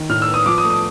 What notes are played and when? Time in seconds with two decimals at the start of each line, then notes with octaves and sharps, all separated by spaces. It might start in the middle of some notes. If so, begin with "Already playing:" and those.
Already playing: D#3
0.09 A2 F6
0.22 E6
0.28 B3
0.34 D#6
0.46 F3 D6
0.58 D#6
0.64 A3
0.70 D#6